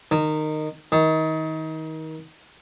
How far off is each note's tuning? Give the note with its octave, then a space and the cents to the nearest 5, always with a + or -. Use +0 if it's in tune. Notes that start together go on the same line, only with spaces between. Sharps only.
D#3 -15
D#3 +30